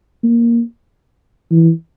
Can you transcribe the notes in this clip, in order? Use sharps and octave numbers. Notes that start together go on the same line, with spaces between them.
A#3
E3